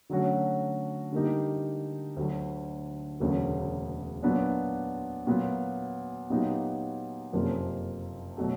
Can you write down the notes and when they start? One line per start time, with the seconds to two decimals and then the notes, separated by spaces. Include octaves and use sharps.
0.10 D3 F#3 A3 C#4 F#4
1.12 D3 G3 A#3 D#4 G4
2.17 D2 D3 F#3
3.20 E1 D2 C#3 F#3 A#3
4.23 A#2 F#3 B3 D4
5.27 A#2 F#3 B3
6.30 A#2 F#3 B3 D#4 G4
7.33 F#1 F2 C3 F3 A#3
8.37 B2 F#3 A3